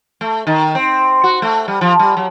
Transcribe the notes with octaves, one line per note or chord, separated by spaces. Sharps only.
A3
D#3
C4
F#4
A3
G3
F3
G3
F#3